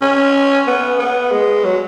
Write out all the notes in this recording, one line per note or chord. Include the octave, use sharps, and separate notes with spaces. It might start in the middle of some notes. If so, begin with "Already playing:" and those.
C#4
B3
B3
G#3
F#3